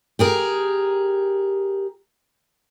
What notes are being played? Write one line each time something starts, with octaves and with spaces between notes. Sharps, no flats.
G4 G#4 A#4